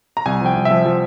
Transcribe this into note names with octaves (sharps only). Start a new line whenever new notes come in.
A#5
C2 G#5
F3 G5
C2
E5
F3
F3